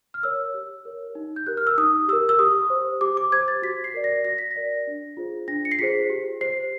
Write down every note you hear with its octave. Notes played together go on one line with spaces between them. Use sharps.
F6
A#4 C#5 E6
G4
A#4 C#5
D#4
G6
G4 A#4 F#6
F6
E6
D#4 D#6
G4 A#4 E6
E6
G4 D#6
C5
G4 D6
D6
C5 G#6
A6
F#4 B6
C7
A#4 D5
A#6
F#4 A#6
B6
A#6
A#4 D5
D4
F4 G#4 C5
D4 A#6
C#7
C7
F4 G#4 C5 B6
G4
C5 C7